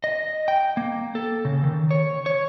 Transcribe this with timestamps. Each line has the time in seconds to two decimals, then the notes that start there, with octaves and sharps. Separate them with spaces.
0.04 D#5
0.48 G5
0.77 A#3
1.15 A4
1.45 C#3
1.64 D#3
1.91 C#5
2.26 C#5